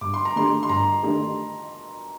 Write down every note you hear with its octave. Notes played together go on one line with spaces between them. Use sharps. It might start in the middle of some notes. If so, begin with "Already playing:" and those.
G2 D6
C6
A#5
D#3 A3 D4 G4 C6
C6
G2 A#5
D#3 A3 D4 G4